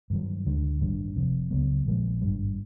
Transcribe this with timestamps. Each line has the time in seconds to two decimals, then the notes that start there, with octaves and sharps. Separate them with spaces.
0.10 G2 D#3 F#3
0.46 D2 D3 F3 G#3
0.80 A1 G2 D#3
1.16 F1 F2 C3
1.51 C#2 C#3 F#3 B3
1.86 A#1 A#2 F3 G#3
2.21 G#1 G2 D3 G3